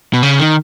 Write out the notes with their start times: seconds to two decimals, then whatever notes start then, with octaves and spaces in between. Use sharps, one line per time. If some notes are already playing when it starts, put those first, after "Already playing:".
0.14 B2
0.23 C#3
0.39 D#3